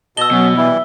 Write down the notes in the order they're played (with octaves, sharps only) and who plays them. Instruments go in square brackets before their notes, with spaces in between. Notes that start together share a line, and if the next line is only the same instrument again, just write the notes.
[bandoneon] B2 D#5 A5 [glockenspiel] E6 G7
[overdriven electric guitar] B2 [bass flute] F#3 [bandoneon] B3 C#4
[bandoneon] E3 G3 E4 [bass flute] E5